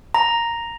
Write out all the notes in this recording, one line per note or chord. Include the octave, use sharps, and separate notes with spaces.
A#5